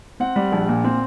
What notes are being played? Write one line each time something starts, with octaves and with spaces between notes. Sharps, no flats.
C4 F#5
G3
A#1
A#2
C4